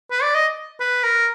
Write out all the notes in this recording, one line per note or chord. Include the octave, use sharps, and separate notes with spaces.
B4
D5
D#5
B4
A#4